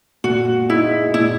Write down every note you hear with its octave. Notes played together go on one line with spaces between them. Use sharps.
A#2 F#4
G#3 D#4 E4
A#2 E4